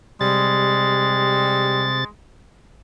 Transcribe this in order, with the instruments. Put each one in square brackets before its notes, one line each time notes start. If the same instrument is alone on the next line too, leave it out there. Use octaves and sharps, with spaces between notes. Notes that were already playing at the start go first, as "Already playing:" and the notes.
[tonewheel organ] C3 A6 [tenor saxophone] G3 [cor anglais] G#3